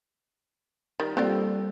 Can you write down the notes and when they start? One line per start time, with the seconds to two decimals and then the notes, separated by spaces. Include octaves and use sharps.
1.00 D#3 G3
1.17 G3 A#3 C4 F4 G4 A4 D5